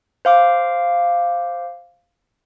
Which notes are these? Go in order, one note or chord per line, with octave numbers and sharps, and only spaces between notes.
C5 F5 D6